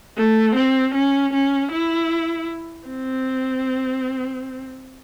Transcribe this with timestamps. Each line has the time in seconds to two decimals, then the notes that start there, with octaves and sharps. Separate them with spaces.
0.17 A3
0.55 C4
0.94 C#4
1.33 C#4
1.72 E4
2.89 C4